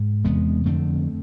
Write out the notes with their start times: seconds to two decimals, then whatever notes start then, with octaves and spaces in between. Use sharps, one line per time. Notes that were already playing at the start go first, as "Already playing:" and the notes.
Already playing: G#2
0.25 E2 C3 G#3 B3
0.66 F2 D3 A3 C4